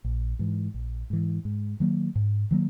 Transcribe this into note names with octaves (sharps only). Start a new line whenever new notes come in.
A#1
G#2 E3
A#1
G#2 E3
G#2
D#3 F#3 A#3
G#2
D#3 F#3 A#3